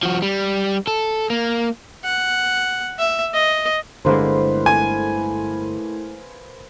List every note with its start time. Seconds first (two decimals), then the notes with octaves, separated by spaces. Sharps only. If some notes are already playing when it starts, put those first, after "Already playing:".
0.03 F3 F#4
0.22 G3
0.87 A4
1.30 A#3
2.04 F#5
2.99 E5
3.34 D#5
4.05 G1 A2 D3 G#3 A#3 B4 C5
4.66 G#5